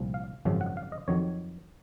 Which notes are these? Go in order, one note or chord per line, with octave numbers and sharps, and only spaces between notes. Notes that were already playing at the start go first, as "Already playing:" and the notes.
Already playing: C2 A#2 F3
F5
G#1 F#2 C#3 F3
F#5
F5
D#5
F2 D#3 F#3 C#5